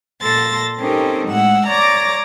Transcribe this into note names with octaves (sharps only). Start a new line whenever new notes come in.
A#2 A4 C6 A6 A#6
C4 C#4 D#4 G4 A4 A#4
A2 G#3 F#5 E6
C#5 D5 A#5 D6 A6 A#6